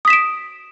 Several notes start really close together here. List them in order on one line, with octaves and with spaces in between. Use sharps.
D#6 B6 E7 D7